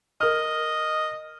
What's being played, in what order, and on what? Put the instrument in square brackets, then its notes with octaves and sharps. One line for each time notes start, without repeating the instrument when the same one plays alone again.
[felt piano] A#4 F6 [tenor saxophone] D#5